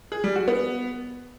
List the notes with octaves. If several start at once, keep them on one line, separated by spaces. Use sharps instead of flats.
G#4
G3
F#4
B3